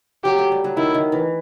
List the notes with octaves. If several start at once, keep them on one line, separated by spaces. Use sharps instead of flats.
F#3 G4
A3
G3
F#3
D#3 E4
D#3
E3